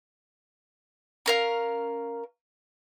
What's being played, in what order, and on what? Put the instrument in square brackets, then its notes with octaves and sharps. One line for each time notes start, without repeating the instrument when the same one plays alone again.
[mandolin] C#4 A#4 F5